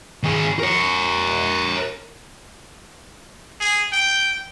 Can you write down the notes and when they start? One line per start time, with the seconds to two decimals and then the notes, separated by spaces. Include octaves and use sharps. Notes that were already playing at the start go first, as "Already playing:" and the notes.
0.23 D#3 G#4
0.60 A#4 C#5
3.60 G#4
3.92 G5